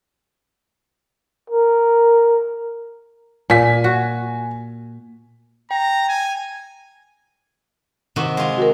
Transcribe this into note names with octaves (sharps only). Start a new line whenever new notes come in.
A#4
A#2 G#5 B6
F#4
G5 A#5
G#5
C3 D#3 F#4
G#3 F4
F#4 A#4